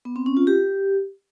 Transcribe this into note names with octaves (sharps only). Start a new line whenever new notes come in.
B3
C4
C#4
F4
G4